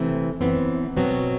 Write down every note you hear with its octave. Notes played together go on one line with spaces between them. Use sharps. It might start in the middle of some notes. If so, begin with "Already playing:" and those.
Already playing: C3 E3 A3 C4
F#2 E3 B3 C4
B2 F#3 B3 C4